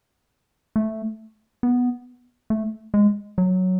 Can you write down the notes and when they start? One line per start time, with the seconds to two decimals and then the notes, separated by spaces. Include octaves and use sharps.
0.76 A3
1.63 B3
2.50 A3
2.94 G#3
3.38 F#3